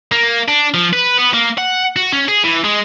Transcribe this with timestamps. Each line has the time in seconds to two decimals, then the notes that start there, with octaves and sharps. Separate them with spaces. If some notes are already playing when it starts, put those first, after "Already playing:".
0.12 A#3
0.48 D4
0.74 F3
0.93 B4
1.18 B3
1.34 A#3
1.58 F#5
1.96 F#4
2.12 C#4
2.28 G#4
2.44 E3
2.64 G#3